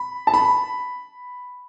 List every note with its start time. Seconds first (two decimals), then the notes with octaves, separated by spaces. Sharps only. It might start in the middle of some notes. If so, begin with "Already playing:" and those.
Already playing: B5
0.27 A5
0.34 B5